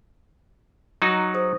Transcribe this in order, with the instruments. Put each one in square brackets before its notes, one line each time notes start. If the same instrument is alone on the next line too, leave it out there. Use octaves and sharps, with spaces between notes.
[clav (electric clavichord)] F#3 D#4 F#4 [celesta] A#5
[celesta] G#4 C5 D#6